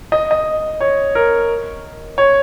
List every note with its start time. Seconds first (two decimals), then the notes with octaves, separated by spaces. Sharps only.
0.12 D#5
0.31 D#5
0.81 C#5
1.15 A#4
2.18 C#5